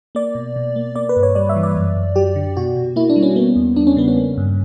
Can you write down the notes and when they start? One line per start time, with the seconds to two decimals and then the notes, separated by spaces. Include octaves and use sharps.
0.15 A#3 D5
0.35 B2
0.56 B2
0.76 A#3
0.95 A#3 D5
1.09 B4
1.16 G2
1.23 C#5
1.35 G3 D5
1.49 E5
1.56 E3
1.63 D5
1.76 F#2
1.97 F#2
2.16 F#3 G4
2.36 D3
2.57 B2 F#4
2.77 B2
2.96 A#3 E4
3.10 D4
3.16 G3
3.23 C#4
3.36 A#3 B3
3.56 E2
3.76 G3 D4
3.87 C#4
3.97 C#3 B3
4.08 C#4
4.17 A#3
4.38 G2